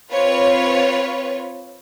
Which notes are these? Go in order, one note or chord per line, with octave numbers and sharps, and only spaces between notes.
C4 F4 B4 C#5